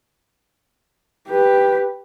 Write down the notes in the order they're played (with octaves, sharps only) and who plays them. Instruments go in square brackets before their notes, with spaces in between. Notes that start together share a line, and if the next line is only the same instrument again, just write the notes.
[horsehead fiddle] G4 B4